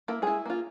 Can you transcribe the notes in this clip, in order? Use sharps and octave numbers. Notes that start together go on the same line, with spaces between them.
A#3 E4 A#4
G#3 E4 G#4
A#3 F4